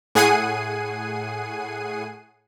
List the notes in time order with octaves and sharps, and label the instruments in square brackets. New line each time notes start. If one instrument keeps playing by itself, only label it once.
[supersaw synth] A2 G#4 F#5 G#5 C7 D#7